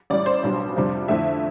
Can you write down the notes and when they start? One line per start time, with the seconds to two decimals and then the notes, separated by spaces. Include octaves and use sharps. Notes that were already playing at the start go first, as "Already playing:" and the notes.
0.10 A1 A2 G3 D5
0.26 C5
0.43 B1 B2 G3 D4
0.76 F2 C3 G3 D4
1.08 F2 D3 A3 E4 E5